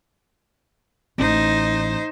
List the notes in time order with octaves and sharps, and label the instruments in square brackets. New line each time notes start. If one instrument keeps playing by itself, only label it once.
[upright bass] A1 [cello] D#4 C5